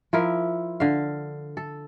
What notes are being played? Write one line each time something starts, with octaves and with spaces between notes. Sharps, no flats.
F3 E4 A#4
D3 F5
A4